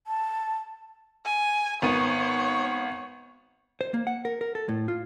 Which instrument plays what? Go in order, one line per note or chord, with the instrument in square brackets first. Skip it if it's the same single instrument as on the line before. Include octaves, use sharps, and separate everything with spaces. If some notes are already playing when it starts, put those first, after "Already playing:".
[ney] A5
[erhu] G#5
[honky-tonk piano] G#1 B3 D#7 [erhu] C#5
[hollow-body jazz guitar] C5
A#3
F#5
A#4
A#4
A4
A2
F4